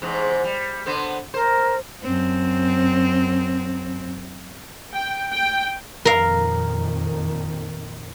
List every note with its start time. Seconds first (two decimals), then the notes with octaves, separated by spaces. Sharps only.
0.02 E2 G#2 C3
0.44 G3
0.86 D3 B3 C5
1.34 A#4 C5
2.03 F#2 C4
4.94 G5
5.32 G5
6.05 F2 A#2 D#3 A#4 F5